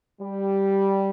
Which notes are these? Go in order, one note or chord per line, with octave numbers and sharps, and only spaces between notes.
G3